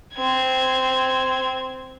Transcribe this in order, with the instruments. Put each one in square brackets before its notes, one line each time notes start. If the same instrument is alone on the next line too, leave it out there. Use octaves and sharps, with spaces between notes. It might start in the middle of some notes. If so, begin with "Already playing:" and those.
[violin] C4 G#6